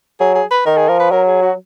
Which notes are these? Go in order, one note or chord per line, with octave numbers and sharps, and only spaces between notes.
F#3 G#4
G#4
B4
D#3 A#4
G#4
F3 A#4
B4
F#3 A#4
G#4
F#4